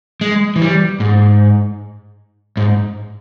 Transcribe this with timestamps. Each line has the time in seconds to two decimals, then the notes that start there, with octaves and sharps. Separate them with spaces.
0.21 G#3
0.56 E3
0.62 G3
1.00 G#2
2.57 G#2